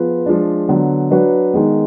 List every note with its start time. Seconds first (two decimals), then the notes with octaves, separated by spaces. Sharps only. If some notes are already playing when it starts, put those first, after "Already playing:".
Already playing: F3 B3 F4 G#4 B4
0.26 F3 G#3 D4
0.69 D3 F#3 B3
1.11 F#3 D4 F#4 B4
1.54 D#3 G#3 B3